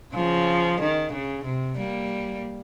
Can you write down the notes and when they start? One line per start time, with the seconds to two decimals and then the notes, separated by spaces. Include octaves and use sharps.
0.14 C#3 F3
0.80 D#3
1.12 C#3
1.44 C3
1.77 G3 A#3